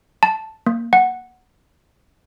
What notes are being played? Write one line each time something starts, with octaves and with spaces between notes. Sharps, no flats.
A5
A#3
F#5